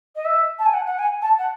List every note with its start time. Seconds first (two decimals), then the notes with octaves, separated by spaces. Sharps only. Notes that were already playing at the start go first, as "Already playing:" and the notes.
0.15 D#5
0.25 E5
0.59 A5
0.66 G#5
0.74 F#5
0.86 F#5
0.99 G#5
1.22 A5
1.38 F#5